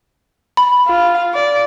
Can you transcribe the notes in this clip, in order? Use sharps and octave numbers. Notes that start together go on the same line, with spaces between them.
B5
F4 F5
D5